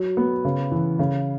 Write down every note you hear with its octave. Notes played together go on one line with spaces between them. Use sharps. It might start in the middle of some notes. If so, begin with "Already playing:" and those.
Already playing: F#3
B3
C#3
E3
C#3